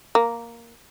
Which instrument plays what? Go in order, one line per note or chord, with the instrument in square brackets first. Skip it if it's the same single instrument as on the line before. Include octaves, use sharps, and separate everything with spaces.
[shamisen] A#3